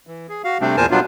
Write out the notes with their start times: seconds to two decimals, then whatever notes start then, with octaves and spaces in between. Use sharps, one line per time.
0.07 E3
0.29 G#4
0.44 F#4 F5
0.61 C3 G3 A3 C4 D4
0.77 E2 A#2 A#4 C5 G#5 A5
0.91 B2 F#3 G3 B3 D4 F4